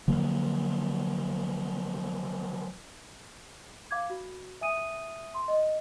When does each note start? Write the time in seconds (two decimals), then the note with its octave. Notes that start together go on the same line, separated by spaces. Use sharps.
0.08 D3 F3 F#3 A#3
3.91 F5 D6 G#6
4.10 F#4
4.61 E5 G#5 D#6 D#7
5.34 C6
5.48 D#5